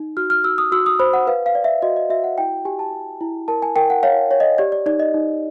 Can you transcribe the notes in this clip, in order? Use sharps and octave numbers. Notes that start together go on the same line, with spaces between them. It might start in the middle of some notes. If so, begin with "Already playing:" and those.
Already playing: D#4
F#4 F6
F6
F#4 E6
D#6
F#4 E6
D#6
C5 B5
F#5
B4 F5
F5
D5
E5
F#4 D#5
D#5
F#4 E5
F#5
E4 G5
G4 G#5
A5
G4
E4
A#4 A5
G#5
A#4 G5
F#5
C#5 F5
C#5
D#5
G4 D5
D5
D#4 D5
D#5
D#4